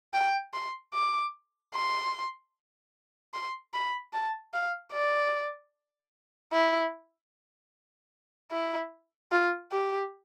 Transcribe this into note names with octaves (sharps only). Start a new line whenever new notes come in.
G5
C6
D6
C6
C6
B5
A5
F5
D5
E4
E4
F4
G4